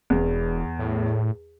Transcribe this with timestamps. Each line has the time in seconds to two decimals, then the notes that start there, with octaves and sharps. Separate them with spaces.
0.10 E1 E2
0.79 A2